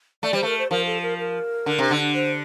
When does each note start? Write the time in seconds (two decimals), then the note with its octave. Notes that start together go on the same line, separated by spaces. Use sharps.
0.23 A3 D5
0.33 G3 C5
0.43 A3 A#4
0.59 C5
0.71 F3 A#4
0.87 A4
1.03 A#4
1.19 A#4
1.66 D3
1.79 C3
1.91 D3
2.14 C5